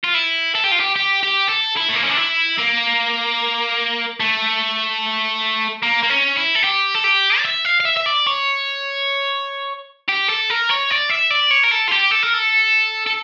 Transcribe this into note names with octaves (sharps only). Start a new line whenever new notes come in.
F4
E4
A4
G4
F4
G4
G4
G4
A4
E4
A3
A#3
C#4
D4
E4
A#3
A3
A#3
A#3
C#4
E4
A4
G4
A4
G4
D5
E5
F5
F5
E5
E5
D5
C#5
G4
A4
A#4
C#5
D5
E5
D5
C#5
A#4
A4
F4
G4
A4
A#4
A4
A4